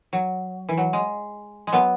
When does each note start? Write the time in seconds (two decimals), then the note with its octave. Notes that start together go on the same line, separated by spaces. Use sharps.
0.13 F#3
0.69 E3
0.78 F#3
0.93 G#3
1.67 G#3
1.72 F#3 B3